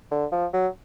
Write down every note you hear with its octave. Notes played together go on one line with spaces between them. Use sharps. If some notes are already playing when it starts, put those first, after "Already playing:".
D3
F3
F#3